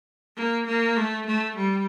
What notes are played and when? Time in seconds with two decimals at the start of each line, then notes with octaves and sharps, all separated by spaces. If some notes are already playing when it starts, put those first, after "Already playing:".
0.37 A#3
0.67 A#3
0.97 A3
1.26 A3
1.57 G3